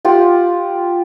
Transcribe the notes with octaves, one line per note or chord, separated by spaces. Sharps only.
F4 G4 F#5